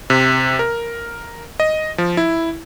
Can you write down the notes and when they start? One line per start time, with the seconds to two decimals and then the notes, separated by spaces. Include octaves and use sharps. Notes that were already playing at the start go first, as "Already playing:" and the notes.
0.10 C3
0.59 A#4
1.60 D#5
1.98 F3
2.17 E4